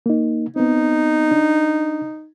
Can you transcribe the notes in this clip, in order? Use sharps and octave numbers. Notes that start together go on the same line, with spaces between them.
A#3 D#4
B3 C4 D#4
D4